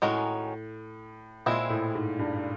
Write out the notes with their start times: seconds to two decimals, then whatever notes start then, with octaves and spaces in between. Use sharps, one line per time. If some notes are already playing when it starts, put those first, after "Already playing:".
0.02 A2 D#3 G#3 C#4 F#4 A#4
1.46 A#2 G#3 C4 E4
1.70 A2
1.95 G#2
2.19 G2